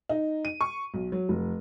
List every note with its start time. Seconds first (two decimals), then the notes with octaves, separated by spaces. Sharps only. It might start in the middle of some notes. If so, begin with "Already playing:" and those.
0.09 D#4
0.45 D#7
0.61 C#6
0.94 B1
1.12 F#3
1.29 F1